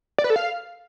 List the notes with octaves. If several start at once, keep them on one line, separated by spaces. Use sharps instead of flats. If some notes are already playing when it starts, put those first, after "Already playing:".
D5
B4
A4
F5